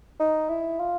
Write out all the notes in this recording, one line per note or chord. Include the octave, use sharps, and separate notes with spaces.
D#4
E4
F4